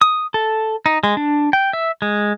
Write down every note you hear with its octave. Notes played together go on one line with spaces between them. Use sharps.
D#6
A4
D#4
G#3
D4
G5
E5
G#3